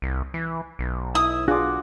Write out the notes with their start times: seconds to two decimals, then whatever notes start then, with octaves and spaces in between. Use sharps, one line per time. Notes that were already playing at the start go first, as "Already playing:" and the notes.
0.02 C2
0.34 E3
0.79 B1
1.15 E4 D#6
1.48 D4 F4 F#4 G#4 D6